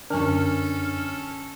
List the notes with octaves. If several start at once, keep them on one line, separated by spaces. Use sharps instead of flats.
F#2 D3 C#4 D4 A4 G#5 C#6 F6